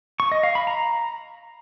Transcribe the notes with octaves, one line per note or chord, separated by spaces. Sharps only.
C#6
D#5
F5
B5
A#5